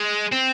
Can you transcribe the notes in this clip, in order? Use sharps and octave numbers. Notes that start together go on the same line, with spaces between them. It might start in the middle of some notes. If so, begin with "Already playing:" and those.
Already playing: G#3
C4